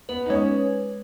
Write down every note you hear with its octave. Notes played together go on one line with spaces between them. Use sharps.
B3 B4
D#4
G#3 C#4